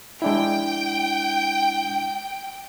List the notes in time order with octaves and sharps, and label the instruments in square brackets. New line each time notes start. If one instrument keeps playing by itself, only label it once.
[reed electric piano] G#3 D4 E4 [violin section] G5